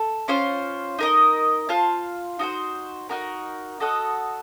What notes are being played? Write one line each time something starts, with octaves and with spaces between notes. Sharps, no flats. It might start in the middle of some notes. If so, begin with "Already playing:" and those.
Already playing: A4
C#4 F4 C5 F5
D#4 A#4 D#5
F4 C5 F5 A5
D#4 F#4 C5
D#4 F#4 A#4
F#4 A4 D#5 F#5